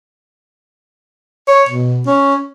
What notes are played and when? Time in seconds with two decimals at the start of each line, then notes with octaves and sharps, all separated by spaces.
1.48 C#5
1.69 B2
2.06 C#4